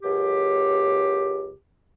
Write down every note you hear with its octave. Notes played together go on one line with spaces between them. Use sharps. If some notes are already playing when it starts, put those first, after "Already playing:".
C#2 F#2 G4